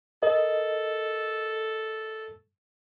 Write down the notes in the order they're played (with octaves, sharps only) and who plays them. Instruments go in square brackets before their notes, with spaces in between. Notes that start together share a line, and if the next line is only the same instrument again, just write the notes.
[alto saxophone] A4 [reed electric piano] A#4 D#5